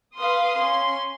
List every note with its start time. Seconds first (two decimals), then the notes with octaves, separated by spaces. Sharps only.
0.17 B4 F5 C6 D#6
0.58 C#4 C6